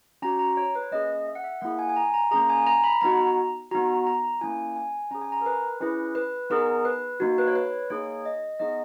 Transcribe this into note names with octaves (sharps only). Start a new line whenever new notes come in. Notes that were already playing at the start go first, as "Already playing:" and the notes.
C#4 F#4 A#5
A#5
C#5
B4
A#3 C#4 G#4 D#5
E5
F#5
E5
A#3 E4 G#4 F#5
G#5
G#5
A#5
A#5
A#3 C#4 G#4 A#5
G#5
A#5
B5
B3 D#4 F#4 A#5
B3 D#4 F#4 A#5
A#5
A#3 C#4 E4 G#5
G#5
C#4 G#4 A#5
G#5
A#5
A#4
B4
C#4 E4 G#4 B4
B4
B3 D#4 G#4 A#4
B4
A#3 D#4 F#4
B4
C#5
B4
A#3 D#4 G#4 C#5
D#5
B3 D#4 G#4 D#5